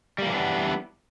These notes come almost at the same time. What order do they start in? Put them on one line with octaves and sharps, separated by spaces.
G3 A#3 E3 D4 B3